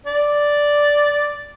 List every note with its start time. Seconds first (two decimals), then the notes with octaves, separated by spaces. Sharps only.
0.06 D5